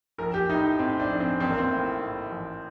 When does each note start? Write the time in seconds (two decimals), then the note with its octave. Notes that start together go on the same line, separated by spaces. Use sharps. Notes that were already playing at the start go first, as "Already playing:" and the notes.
0.18 A#1 A#4
0.34 G4
0.49 A2 D#4
0.79 A2 C4
1.00 D4
1.10 A#1
1.20 C4
1.40 A1 C4
1.49 A#3
1.58 C4
1.70 A2
2.01 A2
2.31 A1